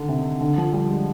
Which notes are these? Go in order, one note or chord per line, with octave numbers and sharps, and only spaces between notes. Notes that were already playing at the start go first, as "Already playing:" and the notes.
Already playing: D3 D#3
C3
D3
F3
G3
G#3